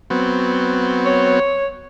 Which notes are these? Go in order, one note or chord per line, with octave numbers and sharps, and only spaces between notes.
F#3 B3 C4
C#5